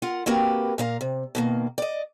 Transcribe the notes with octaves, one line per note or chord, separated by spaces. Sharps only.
F4 A#4 F#5
A#3 C4 F#4 G4 A#4 B4
A#2 A#4 F5
C3
B2 D#3 A#3
D5 D#5